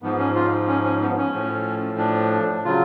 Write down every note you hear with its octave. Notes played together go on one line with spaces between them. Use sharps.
G#2 F3 B3
C#4
F4
C#4
C#4
B3
C#4
A2 F3
D4
C#3 F#3 F4